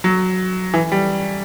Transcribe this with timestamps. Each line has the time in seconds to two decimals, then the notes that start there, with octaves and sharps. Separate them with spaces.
0.04 F#3
0.74 E3
0.92 G3